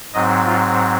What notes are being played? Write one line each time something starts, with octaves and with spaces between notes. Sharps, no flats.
G#2 F#3 C4 D#5
F4